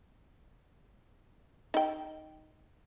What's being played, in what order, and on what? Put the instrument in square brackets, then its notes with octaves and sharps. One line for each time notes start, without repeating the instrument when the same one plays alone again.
[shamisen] D#4 G5